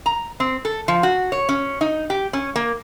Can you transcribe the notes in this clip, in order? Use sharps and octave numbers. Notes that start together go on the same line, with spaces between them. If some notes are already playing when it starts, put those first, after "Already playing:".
A#5
C4
A4
F3
F#4
C#5
C#4
D#4
G4
C#4
A#3